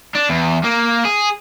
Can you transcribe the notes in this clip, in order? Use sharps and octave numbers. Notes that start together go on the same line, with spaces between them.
D4
E2
A#3
G#4